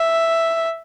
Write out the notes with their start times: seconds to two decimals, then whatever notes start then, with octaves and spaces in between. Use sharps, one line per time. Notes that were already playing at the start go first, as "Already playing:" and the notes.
Already playing: E5